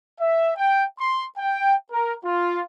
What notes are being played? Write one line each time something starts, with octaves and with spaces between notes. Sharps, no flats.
E5
G5
C6
G5
A#4
F4